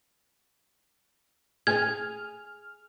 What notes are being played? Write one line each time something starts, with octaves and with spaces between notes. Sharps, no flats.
G#4 G#5 F6 G#6